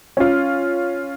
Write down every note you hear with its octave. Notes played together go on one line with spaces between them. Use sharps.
C#4 F4